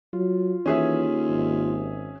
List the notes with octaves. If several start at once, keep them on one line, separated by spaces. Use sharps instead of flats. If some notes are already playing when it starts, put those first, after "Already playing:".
F#3 F4
D#2 E3 C#4 G#4 E5
G#1